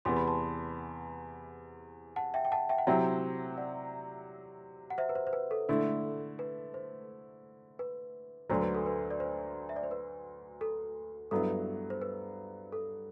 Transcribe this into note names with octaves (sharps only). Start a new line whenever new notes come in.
E2 C3 E3 B3 C6
B5
A5 C6
F#5 A5
E5 G5
G5
F#5 A5
E5 G5
F#5
C3 F#3 C4 E4 E5 G5
D5 F#5
F#5
C5 E5
B4
C5
C5
B4
A4
D3 A3 E4
B4
C5
B4
D2 D3 F#3 A3 C5
B4
A4
B4
D5
C5
E5
D5
C5
B4
A4
G2 F#3 B3 E4 A4
C5
B4
A4